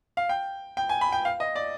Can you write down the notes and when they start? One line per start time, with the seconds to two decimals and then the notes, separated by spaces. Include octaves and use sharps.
0.17 F5
0.29 G5
0.77 G5
0.89 G#5
1.01 B5
1.12 G5
1.25 F5
1.40 D#5
1.56 D5